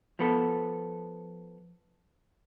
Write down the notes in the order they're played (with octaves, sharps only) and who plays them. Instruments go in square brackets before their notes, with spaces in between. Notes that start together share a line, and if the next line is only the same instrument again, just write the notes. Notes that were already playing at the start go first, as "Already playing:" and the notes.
[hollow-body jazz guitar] F3 B3 A4